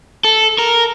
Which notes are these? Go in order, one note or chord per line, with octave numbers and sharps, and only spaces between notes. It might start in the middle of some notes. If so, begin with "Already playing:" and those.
A4
A#4